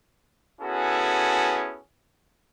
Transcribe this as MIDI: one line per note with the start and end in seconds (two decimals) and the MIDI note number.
0.62 1.78 59
0.62 1.78 61
0.62 1.78 64
0.62 1.78 66
0.62 1.78 68
0.62 1.78 69